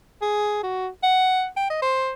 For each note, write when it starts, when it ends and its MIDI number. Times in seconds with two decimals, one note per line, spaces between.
0.22 0.61 68
0.63 0.88 66
1.03 1.46 78
1.57 1.67 79
1.70 1.80 75
1.82 2.13 72